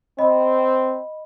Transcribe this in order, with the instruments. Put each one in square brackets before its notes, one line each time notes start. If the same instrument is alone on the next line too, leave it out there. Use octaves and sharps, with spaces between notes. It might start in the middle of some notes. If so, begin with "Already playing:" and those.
[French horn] C4 [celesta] D#5 B5